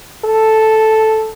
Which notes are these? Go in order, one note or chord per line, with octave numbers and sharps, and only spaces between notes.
A4